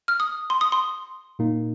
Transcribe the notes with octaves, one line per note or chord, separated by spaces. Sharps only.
F6
D#6
C6
D#6
C6
A#2 A#3 D#4